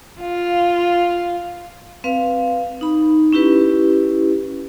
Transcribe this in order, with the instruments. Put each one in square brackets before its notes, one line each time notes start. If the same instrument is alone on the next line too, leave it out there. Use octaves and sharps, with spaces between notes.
[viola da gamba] F4 [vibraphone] F5
[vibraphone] C4 B4 F5
D#4 B5
C#4 E4 G4 B4